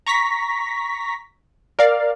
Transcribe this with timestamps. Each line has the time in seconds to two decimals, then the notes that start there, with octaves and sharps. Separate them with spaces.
0.06 A#5 C#6 A#6 B6
1.79 A#4 D5 F5